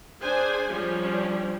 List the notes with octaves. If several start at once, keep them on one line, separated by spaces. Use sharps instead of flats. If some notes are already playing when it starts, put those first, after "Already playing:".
D4 G#4 C5 G#5
F3 G3 C#4 D4